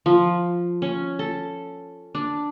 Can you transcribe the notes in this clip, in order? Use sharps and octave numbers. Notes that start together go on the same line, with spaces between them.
F3
C#4
A4
D4